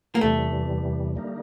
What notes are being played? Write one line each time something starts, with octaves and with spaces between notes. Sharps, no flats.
A#3
E2 C3 E3 G3 A3
D3 G3 A#3 D#4